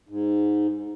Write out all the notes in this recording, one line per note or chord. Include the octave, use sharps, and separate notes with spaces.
G#2